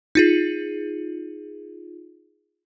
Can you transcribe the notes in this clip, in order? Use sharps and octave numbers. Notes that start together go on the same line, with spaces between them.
D#4 F4 G#4